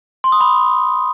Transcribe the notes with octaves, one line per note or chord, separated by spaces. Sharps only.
C6
D#6
B5